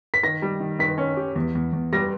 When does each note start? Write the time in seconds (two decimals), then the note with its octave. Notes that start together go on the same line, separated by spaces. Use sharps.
0.14 B6
0.23 D#3 A#6
0.42 G3
0.60 D#3
0.79 D#3 B6
0.98 C#4
1.17 G4
1.36 E2
1.55 E2
1.73 E2
1.93 G3 A#6